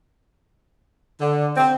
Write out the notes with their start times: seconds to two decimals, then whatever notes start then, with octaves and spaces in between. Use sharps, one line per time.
1.20 D3
1.56 C4